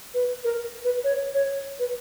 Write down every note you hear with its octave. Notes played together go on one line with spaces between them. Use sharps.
B4
A#4
B4
C#5
C#5
B4